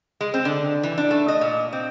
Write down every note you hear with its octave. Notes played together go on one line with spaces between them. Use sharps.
G#3
C4
D3
E3
D4
A3
D#5
A#2
C4